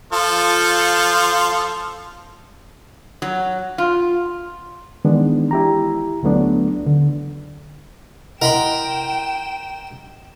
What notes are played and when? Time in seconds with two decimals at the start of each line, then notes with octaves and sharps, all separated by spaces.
0.13 F3 F4 A4
3.22 F#3
3.78 F4
5.05 D#3 E3 G#3 B3 D4
5.51 E4 G4 A#5
6.23 D2 F#3 A3 B3 D4
6.86 D3
8.42 E4 A#4 D#5 F#5 G5 B5 C6 E7